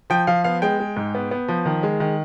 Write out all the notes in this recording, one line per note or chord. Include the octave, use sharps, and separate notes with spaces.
F3 G5
F3 F5
B3 F5
G#3 G5
G#3
G#2
B3
B3
F3
D#3
G#3
D#3